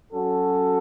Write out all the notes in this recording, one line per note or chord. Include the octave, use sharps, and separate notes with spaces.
F#3 C#4 F#4 A4